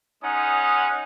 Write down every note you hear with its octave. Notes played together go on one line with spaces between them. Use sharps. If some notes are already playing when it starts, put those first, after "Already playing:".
G#3 C#4 D#4 F#5 D#6